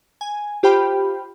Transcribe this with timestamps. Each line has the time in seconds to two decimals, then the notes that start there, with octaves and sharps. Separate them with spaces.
0.21 G#5
0.63 F4 G4 C5 G5 B5